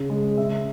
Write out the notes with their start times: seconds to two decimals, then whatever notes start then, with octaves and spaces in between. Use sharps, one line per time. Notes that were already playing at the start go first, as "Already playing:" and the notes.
Already playing: C#3
0.10 G#3
0.37 C#3 E5